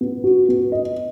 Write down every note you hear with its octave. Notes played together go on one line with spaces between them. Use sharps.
B3
F#4
B3
D#5